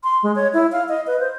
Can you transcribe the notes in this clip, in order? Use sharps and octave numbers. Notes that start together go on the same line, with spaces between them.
C6
G#3
C#5
E4
F5
D#5
B4
C5